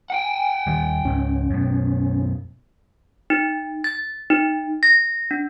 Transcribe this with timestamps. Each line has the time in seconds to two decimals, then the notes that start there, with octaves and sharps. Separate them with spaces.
0.10 F#5 G5
0.67 D#2 D#3 G3
1.05 C#2 G#2 C#4
1.50 F#2 B2
3.30 D#4
3.84 A6
4.30 D#4
4.83 A#6
5.31 D4